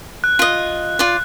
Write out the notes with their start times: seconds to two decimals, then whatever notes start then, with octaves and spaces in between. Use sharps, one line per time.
0.24 F#6
0.39 F4 D#5
0.99 F4 D5